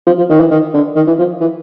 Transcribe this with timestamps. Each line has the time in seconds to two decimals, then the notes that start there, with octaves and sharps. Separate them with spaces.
0.07 F3
0.18 F3
0.29 D#3
0.40 E3
0.51 D#3
0.74 D3
0.96 D#3
1.07 E3
1.19 F3
1.41 E3